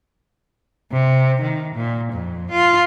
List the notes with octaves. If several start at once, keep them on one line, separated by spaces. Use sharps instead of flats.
C3
D#3
A#2
F2
F4